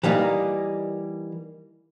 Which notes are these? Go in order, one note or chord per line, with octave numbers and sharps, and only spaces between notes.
E3 G3 A#3 D#4